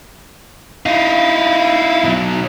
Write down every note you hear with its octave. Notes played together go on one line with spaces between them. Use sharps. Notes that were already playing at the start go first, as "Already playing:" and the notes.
D#4 E4 F5
B2 F#3